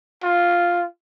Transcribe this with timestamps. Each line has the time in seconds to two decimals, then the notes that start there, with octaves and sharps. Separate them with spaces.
0.23 F4